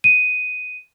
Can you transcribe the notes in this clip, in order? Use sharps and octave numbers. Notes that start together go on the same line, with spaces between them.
D#7